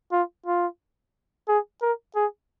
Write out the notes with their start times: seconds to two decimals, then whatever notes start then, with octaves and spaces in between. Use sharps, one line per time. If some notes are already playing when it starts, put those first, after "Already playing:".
0.12 F4
0.46 F4
1.48 G#4
1.82 A#4
2.16 G#4